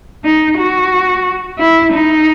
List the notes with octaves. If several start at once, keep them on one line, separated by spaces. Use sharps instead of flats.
D#4
F#4
E4
D#4